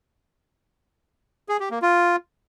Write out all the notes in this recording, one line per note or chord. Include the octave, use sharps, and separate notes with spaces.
G#4
G4
A#3
F4